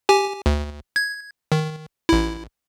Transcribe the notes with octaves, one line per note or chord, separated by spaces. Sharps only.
G4 G#5
D2
G#6
D#3
A1 E4